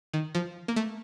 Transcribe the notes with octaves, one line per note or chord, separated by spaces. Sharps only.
D#3
F3
A#3
A3